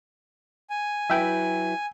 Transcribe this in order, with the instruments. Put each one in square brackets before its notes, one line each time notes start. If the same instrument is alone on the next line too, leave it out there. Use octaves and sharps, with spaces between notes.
[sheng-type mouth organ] G#5
[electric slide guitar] F#3 E4 B4 [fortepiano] E5 G5